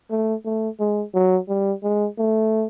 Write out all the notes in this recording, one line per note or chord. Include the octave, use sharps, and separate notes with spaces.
A3
A3
G#3
F#3
G3
G#3
A3